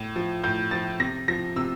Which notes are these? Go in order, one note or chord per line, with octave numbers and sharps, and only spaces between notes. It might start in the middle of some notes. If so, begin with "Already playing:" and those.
Already playing: A2
F3
A2 G6
F3 A6
C3 A#6
F3 A#6
C3 E6